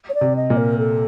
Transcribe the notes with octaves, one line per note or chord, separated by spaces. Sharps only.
C#5
D5
C3
D#5
A#2
A#4
A4